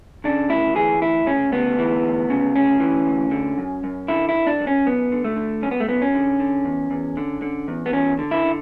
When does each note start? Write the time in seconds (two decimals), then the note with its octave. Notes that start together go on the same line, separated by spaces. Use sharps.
0.24 C#3 D4
0.49 D2 E4
0.75 E3 G#4
1.01 D2 E4
1.26 C#3 C#4
1.52 D2 B3
1.79 E3
2.03 D2
2.30 C#3
2.55 D2 C#4
2.80 E3
3.07 D2
3.31 D3
3.58 F#2
3.84 F#2
4.08 D3 E4
4.29 E4
4.35 D3
4.47 D4
4.60 F#2
4.67 C#4
4.86 F#2 B3
5.12 D3
5.24 A3
5.36 D3
5.62 F#2 C#4
5.71 B3
5.80 A3
5.88 F#2 B3
6.02 C#4
6.14 D3
6.40 D3
6.65 E2
6.91 E2
7.17 D3
7.42 D3
7.68 E2
7.86 B3
7.93 E2 C#4
8.19 D3
8.31 E4
8.45 D3